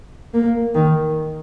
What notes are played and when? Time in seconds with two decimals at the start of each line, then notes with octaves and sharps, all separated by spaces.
0.34 A#3
0.74 D#3